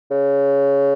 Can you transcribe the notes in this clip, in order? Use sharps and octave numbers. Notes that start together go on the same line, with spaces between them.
C#3